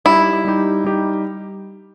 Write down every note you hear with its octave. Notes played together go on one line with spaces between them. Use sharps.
G3 D#4 E4 G4
G3 D#4 G4
G3 D#4 G4